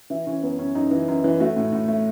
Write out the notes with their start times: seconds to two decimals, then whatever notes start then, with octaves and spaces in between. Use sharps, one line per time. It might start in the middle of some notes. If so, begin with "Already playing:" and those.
0.10 E3 E4
0.27 E3 C#4
0.43 F#2 B3
0.59 F#2 C#4
0.75 F#2 D#4
0.91 E3
1.08 F#2
1.24 E3
1.40 A3 F#4
1.57 A2
1.73 A2
1.88 A3